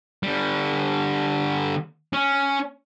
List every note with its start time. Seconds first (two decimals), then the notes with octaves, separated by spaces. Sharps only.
0.23 D3 G3
2.13 C#4